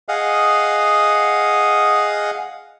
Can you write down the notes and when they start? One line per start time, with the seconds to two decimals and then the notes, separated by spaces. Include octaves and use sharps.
0.09 G#4 D#5 F5 F#5